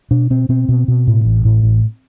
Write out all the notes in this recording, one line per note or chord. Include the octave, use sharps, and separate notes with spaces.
B2 D4
B2 C4
B2 C4
B2
B2
A2
A1
A2
A1